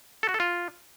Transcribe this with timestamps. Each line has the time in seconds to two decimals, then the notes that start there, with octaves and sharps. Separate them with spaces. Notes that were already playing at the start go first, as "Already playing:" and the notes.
0.23 A4
0.29 F#4
0.34 A4
0.40 F4